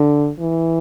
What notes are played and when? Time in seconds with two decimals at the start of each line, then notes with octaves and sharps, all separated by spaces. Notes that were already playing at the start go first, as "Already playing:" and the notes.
Already playing: D3
0.40 E3